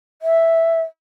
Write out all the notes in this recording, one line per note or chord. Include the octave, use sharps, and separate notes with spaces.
E5